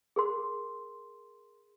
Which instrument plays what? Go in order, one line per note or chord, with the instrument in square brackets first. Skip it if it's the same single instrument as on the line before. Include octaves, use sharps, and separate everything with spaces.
[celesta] G#4 A#4 C6